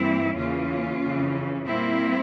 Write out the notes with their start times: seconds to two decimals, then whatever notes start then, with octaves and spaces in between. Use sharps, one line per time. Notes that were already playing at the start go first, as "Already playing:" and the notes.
Already playing: G2 E3 A#3 C4 E4
0.36 E2 C#3 E3 A#3 C#4 F4
1.02 F2 C#3 E3
1.67 A#2 G3 A#3 C4 E4